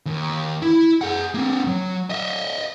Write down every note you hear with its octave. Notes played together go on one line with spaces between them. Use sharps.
D#2
E4
G#4 F#5
A#3 C4
F#3
D#5 E5